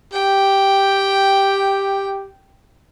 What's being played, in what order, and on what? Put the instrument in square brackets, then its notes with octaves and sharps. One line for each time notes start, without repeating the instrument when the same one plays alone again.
[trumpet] G4 [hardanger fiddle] G5